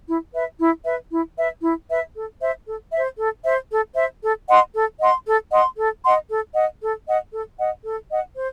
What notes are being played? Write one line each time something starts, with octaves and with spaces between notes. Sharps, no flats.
E4
B4 E5
E4
B4 E5
E4
B4 E5
E4
B4 E5
A4
C5 E5
A4
C5 E5
A4
C5 E5
A4
C5 E5
A4
D#5 F#5 C6
A4
D#5 F#5 C6
A4
D#5 F#5 C6
A4
D#5 F#5 C6
A4
D#5 F#5
A4
D#5 F#5
A4
D#5 F#5
A4
D#5 F#5
C5